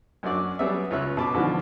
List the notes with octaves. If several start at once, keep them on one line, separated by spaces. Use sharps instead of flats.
F#2 C#4 D4 F#4 D5
F#3 G3 B3 G#4 D5 E5
C#2 F4 C#5 E5 F#6
B2 A5 D6
G#2 B2 D3 E3 F3